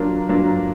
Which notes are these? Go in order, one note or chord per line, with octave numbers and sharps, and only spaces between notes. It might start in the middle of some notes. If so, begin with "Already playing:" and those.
Already playing: F#3 A#3 D4 F4 A#4
F#3 A#3 D4 F4 A#4